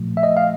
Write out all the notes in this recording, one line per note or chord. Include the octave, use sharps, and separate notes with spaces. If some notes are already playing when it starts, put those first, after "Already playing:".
Already playing: A#2 F3 A3
E5
D#5
F5